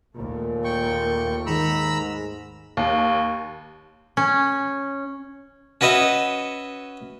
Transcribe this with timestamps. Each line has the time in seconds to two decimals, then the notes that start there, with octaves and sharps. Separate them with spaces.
0.16 D#2 A#2 A3
0.64 G5 C#6
1.47 G#2 D#3 A#5 B5 E6
2.77 D#2
4.17 C#4
5.81 C#4 F#4 B4 D#5 E5